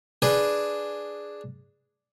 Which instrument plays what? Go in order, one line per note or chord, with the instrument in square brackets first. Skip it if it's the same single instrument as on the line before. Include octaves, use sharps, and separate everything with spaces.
[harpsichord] D4 G#4 B4